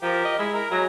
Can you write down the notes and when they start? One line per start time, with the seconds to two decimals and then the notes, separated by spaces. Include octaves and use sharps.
0.02 F3 G4 A#4
0.25 D#5
0.39 G#3 E4
0.53 E4 A#4
0.71 F#3 G#3 B3 A#5